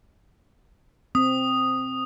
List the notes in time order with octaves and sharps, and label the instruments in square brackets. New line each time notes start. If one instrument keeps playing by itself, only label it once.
[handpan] C4 [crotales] D#6